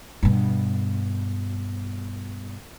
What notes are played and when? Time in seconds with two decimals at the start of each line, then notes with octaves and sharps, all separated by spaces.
0.23 G2 B2